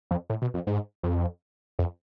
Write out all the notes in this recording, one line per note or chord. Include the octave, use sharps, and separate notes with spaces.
F2
A2
B2
F2
G#2
F2
F2